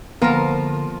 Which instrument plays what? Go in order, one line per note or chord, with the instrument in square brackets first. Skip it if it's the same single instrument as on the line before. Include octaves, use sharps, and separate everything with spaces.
[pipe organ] D3 [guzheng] F3 F4 [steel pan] A#3 B3 A#4